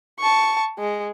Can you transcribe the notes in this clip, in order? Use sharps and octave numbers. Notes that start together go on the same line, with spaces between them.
A5 C#6
G#3